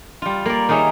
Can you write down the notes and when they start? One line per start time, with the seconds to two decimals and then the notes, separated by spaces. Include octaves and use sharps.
0.22 G3 F4
0.46 A#3 D5
0.69 D#3 D#4 G#4 C#5 E5